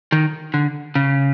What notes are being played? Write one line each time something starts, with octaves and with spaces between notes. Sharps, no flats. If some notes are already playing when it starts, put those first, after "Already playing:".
D#3
D3
C#3